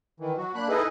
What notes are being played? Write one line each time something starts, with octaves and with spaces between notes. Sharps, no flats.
D#3 E3
F#3 F#4
A#3 D4 B5 F#6
D#4 E4 G#4 A4 B4 D#5